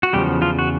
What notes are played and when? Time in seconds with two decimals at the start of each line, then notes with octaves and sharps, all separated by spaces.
0.03 F#4
0.13 E2 C#3 F3 G3 G4
0.41 F3 F4
0.59 F#4